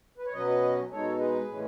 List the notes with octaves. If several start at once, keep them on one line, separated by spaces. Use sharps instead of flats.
B4
C#5
B2 F#3 C#4 B4 D#5
B2 G#3 D#4 A4 C#5
G#4 B4
A2 E3 G#3 C#4